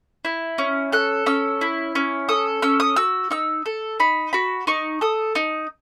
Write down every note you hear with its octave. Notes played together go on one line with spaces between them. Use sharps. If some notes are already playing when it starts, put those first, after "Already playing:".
E4
C#4
A4 F#6
C#4 E6
E4
C#4
A4 D#6
C#4 E6
D#6
F#4 E6
D#4 E6
A4
D#4 B5
F#4 B5
D#4 C#6
A4 D#6
D#4